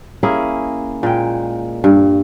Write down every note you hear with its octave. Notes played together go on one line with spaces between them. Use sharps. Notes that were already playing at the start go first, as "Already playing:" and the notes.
A#3 C#4 E4 G#4
A#2 G#3 G5
G2